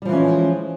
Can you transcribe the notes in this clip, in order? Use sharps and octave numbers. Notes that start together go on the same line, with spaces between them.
E3 F3 G3 G#3 C#4